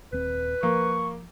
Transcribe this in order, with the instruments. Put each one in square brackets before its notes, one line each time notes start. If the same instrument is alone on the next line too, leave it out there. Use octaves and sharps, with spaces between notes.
[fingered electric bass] D#1 C4 [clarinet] B4
[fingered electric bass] F3 [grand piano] A#3 [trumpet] C#6